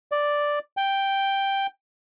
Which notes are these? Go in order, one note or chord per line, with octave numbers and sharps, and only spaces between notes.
D5
G5